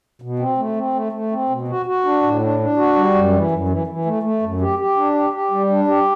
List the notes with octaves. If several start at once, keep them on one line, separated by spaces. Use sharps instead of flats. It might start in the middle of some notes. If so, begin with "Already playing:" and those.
B2
C4
A3
C4
A3
A3
C4
B2
F#4
F#4
D4
A2
D4
D4
F#4
G3
F#2
E3
F#2
E3
E3
A3
A3
F#2
G4
G4
D4
G4
G4
G3
D4
G4